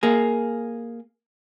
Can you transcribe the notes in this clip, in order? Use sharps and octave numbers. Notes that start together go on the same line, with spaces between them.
A#3 G#4